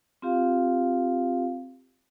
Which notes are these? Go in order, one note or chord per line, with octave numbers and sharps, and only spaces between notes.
C4 F4 G4 F5